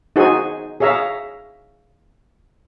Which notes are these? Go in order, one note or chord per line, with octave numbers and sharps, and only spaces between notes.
D#4 F#4 G#4 C5 G#5
G#4 C#5 E5 F5 A#5